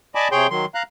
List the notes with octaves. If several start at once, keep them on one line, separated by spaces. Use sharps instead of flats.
D5 D#5 G#5 A5 B5 D6
C3 G#4 C#5 G5 C6 G6
D#3 F#3 C6
F5 A#5 F#6